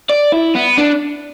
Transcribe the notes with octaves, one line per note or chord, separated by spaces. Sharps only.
D5
E4
B3
D4